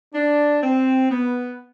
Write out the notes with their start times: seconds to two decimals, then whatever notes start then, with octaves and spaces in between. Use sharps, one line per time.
0.14 D4
0.62 C4
1.10 B3